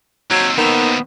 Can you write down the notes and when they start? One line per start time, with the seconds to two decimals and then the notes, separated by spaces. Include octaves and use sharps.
0.31 D#2 F#3 C4
0.58 D#3 B3